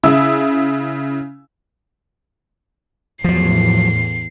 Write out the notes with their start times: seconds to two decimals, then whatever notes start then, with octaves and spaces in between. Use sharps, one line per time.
0.04 C#3 E4 E6
3.24 E2 A2 F3 F#3 C7